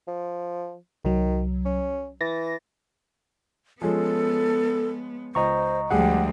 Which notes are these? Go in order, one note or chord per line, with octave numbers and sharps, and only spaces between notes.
F3
C2 D#3 F#3
C#4
E3 A6 A#6
F3 G#3 B3 C#4 A4
C#2 C5 D#5 A#5 C#6
D2 F3 G3 G#3 G#4 F#5 G5